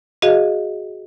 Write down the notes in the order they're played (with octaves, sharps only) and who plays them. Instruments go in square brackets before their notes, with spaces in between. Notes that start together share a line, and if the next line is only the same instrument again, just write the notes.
[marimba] F#4 G#4 D#5 F5